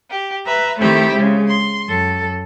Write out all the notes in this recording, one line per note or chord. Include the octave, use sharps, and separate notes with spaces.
G4
B4 E5 A#5
D#3 A3 C4 E4 G4
C#3 G#3
C6
F#2 A4